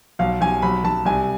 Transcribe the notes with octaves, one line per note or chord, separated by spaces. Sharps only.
B1 F5
B1 G#5
B1 B5
B1 A5
C2 G#5